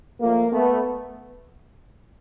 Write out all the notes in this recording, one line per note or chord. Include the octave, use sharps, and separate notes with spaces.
A#2 F3 A3 A#3
A3 B3